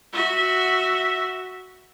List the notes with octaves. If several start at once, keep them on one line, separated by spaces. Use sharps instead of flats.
F#4 E5